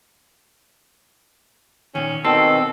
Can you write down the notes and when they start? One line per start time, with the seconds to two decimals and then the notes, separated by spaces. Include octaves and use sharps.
1.95 A#2 D#3 C#4
2.25 B2 D#3 C4 A4 A5